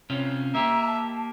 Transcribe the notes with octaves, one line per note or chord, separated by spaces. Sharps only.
C3 C#4 F4
A#3 G4 E5 A#5
A5